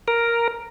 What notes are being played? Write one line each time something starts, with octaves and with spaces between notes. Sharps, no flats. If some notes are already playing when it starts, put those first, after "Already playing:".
A#4